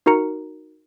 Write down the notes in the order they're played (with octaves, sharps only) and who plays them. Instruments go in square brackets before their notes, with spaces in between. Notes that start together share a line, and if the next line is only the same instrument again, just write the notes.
[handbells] D#4 F#4 A#4 A#5 C#7